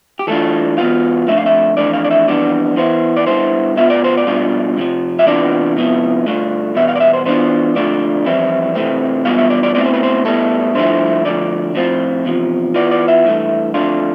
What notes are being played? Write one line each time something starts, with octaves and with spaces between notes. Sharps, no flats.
G4
E3 A3 D4 F4 A4
E2 B2 B3 F4 F5
F2 D3 A3 E5
F5
E5
F2 E3 A3 D4 D5
F5
D5
E5
F2 E3 G3 B3 D4 D5
E3 B3 E4 C5
D5
D3 G3 B3 E4 C5
B2 B3 F4 E5
D5
C5
D5
B2 G3 D4 F4
F2 C3 F3
E5
C3 E3 B3 D4 F4 D5
C3 F3 B3 E4
G2 D3 A3 D4 F4
E2 B2 G3 B3 E5
F5
D5
E5
C5
E3 B3 D4 F4 C5
F2 D3 A3 D4 F4 D5
F2 E3 G3 C4 E4
C3 E3 A3 C4
E2 B2 G3 B3 F4 F5
E5
D5
D5
B2 A3 C4 E4 D5
C5
B4
C5
A2 G3 B3 E4 A4
G2 D3 F3 A3 E4 C5
D3 F3 A3 D5
A2 F3 C4 F4
E2 C3 F3
E3 B3 F4 D5
D5
E5
G2 E3 A3
F2 D3 A3 D4 F4